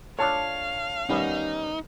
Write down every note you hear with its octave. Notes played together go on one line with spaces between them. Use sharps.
D4 F4 A4 C#5 F5 A5
D#3 G3 B3 C#4 D#4